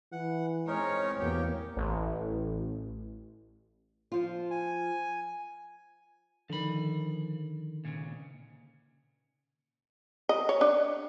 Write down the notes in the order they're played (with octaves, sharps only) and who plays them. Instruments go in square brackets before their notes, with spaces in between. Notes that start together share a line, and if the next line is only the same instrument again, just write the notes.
[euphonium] E3 [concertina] F#5
[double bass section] G#3 C4 [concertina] C#4 D#4 A#4 [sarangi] C#5
[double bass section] E2 A#3 [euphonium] B2 [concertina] G4
[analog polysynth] A1
[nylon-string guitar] F3 F4
[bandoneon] G#5
[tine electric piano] D3 D#3 [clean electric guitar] F3 B5
[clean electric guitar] A#2 C#3
[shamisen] D#5
C#5
D4